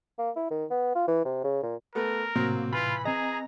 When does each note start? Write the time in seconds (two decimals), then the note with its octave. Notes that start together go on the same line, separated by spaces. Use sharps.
0.18 A#3
0.36 E4
0.51 D#3
0.70 B3
0.95 F4
1.08 E3
1.25 C3
1.44 C#3
1.63 A#2
1.95 A3 B3 A#4
2.36 A2 C3 F#3 A#3 C4
2.73 E3 F4 B5
3.05 C4 G#4 D#5 A#5